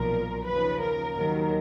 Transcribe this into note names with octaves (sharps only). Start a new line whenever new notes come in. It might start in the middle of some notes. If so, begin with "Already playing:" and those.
Already playing: B1 A#2 F3 A#4
D#2 C#3 F3 B4
A#4
D#2 D#3 F#3